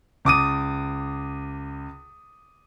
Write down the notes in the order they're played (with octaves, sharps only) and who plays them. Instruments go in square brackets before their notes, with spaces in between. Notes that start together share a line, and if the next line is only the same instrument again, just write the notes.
[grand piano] C#2 D6 D#6 D#7